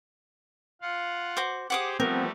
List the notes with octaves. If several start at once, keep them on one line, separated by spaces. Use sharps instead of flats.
F4 F5 F#5
F#4 C5 D6
G4 G#4 C5 F#5 D6 D#6
F3 G3 A3 B3 C4 A#4